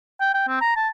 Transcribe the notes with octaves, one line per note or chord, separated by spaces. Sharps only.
G5
G5
C4
A#5
A5